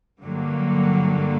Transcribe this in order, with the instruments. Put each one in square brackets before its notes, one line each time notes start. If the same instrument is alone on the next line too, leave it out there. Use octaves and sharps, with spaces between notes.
[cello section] G2 D3 F#3 A#3